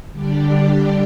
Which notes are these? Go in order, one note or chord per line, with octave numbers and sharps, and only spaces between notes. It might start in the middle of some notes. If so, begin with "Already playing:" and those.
D3 G3 D4 G4 D5